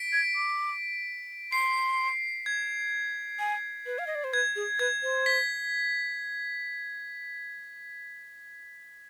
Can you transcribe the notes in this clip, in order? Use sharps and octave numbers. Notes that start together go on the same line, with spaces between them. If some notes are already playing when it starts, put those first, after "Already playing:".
Already playing: B6 D7
G#6
D6
C6 C7
G#6
G#5
B4
F5
D#5
D5
C5
B4 G#6
G#4
B4 G#6
C5
B6